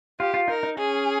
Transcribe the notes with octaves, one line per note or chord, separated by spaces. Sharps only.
F4 G4
F4
D#4 A#4
D#4
C#4 G#4